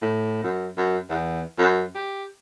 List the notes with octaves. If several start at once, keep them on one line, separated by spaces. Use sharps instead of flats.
A2
F#2
F#2
E2
F#2
G4